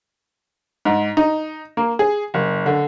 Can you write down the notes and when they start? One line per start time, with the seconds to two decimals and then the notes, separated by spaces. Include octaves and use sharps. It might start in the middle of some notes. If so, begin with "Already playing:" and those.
0.85 G#2
1.17 D#4
1.77 A#3
1.99 G#4
2.34 F#1
2.66 D3